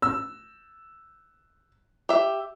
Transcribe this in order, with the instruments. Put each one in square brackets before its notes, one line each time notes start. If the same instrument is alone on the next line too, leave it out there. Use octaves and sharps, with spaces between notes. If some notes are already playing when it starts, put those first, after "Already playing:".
[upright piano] E6
[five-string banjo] G4 E5